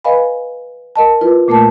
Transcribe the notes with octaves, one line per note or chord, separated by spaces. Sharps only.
B4 D#5 F5 G#5 B5
A#4 D#5 A5
E4 F4 B4
A#2 A3 A#3 A#4 A5